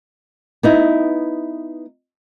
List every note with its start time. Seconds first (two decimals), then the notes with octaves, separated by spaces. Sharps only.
0.63 B3 D#4 E4